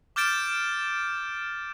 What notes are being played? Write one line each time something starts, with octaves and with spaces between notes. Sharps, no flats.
D6 F6 G6 A6 D7 E7